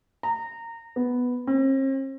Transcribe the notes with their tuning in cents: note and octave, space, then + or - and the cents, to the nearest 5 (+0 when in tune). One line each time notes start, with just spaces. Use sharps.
A#5 -20
B3 +0
C4 +45